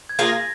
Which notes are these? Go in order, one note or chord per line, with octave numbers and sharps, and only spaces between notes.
G#6
A#3 F4 G#4
A#6